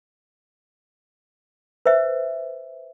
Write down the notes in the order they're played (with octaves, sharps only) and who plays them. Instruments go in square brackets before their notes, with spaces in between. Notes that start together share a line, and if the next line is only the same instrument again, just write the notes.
[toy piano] B4 C5 E5